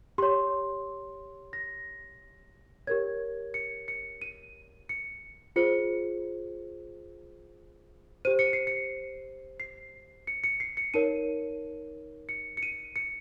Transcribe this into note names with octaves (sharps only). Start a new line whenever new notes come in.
G4 C#5 C6
A#6
G4 A#4 C#5 G#6
C#7
C#7
D#7
C#7
F4 G#4 C5 C#7
G4 C5 D#7
C#7
C7
C#7
C7
C#7
C#7
C7
C#7
D#4 A#4 C#5 D#7
C#7
C#7
D#7
C#7